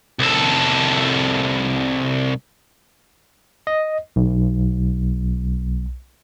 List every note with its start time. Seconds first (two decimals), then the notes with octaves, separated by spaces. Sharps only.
0.19 C2 A4
3.67 D#5
4.16 B1